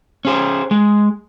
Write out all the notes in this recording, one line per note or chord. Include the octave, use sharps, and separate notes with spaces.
C#4 G#4 C5
G#3